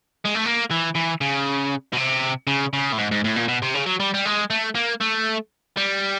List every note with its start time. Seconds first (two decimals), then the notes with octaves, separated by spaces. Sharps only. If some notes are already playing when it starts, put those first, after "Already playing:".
0.25 G#3
0.35 A3
0.45 A#3
0.71 E3
0.96 E3
1.21 C#3
1.93 B2
1.97 C3
2.47 C#3
2.73 C#3
2.92 A2
2.98 G#2
3.11 G#2
3.24 A2
3.36 A#2
3.48 B2
3.62 C3
3.74 C#3
3.86 F#3
4.00 G3
4.14 G3
4.25 G#3
4.50 A3
4.75 A#3
5.01 A3
5.77 G3